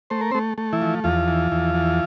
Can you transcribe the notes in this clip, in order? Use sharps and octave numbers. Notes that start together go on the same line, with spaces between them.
A3 C5
A#4
C4 C5
A3
A3
E3 E4
F3
E2 F3 F4
E3
E2
E3